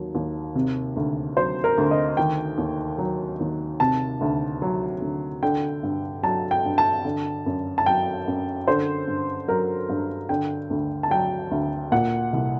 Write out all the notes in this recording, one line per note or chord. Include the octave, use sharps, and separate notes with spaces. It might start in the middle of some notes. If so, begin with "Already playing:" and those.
Already playing: D#2 F#3
D#2
C3
D2
F#3 C5
A#4
D2
D#5
D#3 G5
D#2
F#3
D#2
C3 A5
D2
F#3
D2
D3 G5
G2
F#3 A5
G5
G2
A5
D3
F#2
A5
F#3 G5
F#2
D3 C5
G2
F#3 A#4
G2
D3 G5
D2
A5
F#3 G5
D2
A#2 F#5
C2